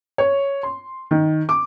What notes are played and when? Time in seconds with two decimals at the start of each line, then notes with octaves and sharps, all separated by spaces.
0.18 C#5
0.63 C6
1.11 D#3
1.49 D6